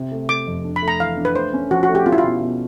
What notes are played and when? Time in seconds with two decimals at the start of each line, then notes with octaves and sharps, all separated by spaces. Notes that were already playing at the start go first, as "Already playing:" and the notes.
Already playing: C3
0.11 A3
0.29 A3 D6
0.47 F2
0.65 D4
0.76 B5
0.82 A3
0.88 A#5
1.00 E3 F5
1.17 D4
1.25 B4
1.35 A3 C5
1.53 C#4
1.71 F3 F#4
1.83 F#4
1.88 A3
1.95 G4
2.06 C#4 F4
2.12 E4
2.18 F4
2.24 B2
2.41 B2